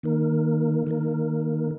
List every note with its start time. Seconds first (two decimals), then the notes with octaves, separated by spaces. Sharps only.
0.03 D#3 A#3 D#4 A#4
0.87 D#3 A#3 D#4 A#4